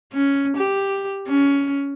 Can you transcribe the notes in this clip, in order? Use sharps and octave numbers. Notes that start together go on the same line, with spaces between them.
C#4
G4
C#4